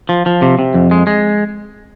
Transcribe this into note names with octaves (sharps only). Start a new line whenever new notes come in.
F3
F3
C3
C3
F2
G#3
G#3